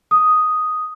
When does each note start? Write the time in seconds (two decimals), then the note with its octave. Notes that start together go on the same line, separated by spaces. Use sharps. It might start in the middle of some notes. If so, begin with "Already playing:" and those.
0.11 D#6